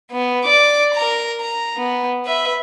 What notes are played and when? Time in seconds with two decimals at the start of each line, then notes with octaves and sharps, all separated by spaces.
0.11 B3
0.45 D5 D6
0.94 A#4 A#5
1.41 A#5
1.77 B3
2.25 B4 E5